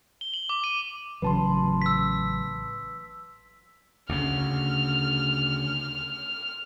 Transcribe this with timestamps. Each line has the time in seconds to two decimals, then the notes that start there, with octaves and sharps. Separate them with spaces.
0.21 G7
0.34 F#7
0.49 D6
0.64 D#7
1.22 A1 C#3 F#3 B4 A5 C6
1.82 E6 B6
4.10 D2 C#3 F6